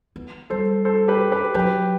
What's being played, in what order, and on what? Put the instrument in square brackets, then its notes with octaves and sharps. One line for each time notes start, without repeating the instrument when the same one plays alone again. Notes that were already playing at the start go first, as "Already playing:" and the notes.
[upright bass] B3
[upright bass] G3 [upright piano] A4 C5
[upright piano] A4 C5
G4 B4
G4 B4
[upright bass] F#3 [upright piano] G4 B4